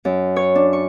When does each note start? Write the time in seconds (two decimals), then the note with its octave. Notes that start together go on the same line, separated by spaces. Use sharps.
0.05 F#2
0.36 C#5
0.55 D4
0.73 C#6